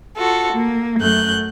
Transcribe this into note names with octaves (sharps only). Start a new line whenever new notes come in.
F4 F#4 A4
A#3
F#2 A3 F#6 G6